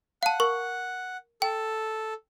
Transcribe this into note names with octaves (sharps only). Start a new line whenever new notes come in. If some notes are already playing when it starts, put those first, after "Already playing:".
F5 F#5 A5
A#4 C#6
A4 G5